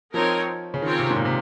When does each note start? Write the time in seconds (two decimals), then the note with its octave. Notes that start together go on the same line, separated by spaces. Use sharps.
0.14 F3 C4 D#4 A#4 C#5
0.74 C#3
0.82 D#3 C4 F4 A#4 C#5
0.99 C3
1.10 G#2
1.16 A#2
1.25 C3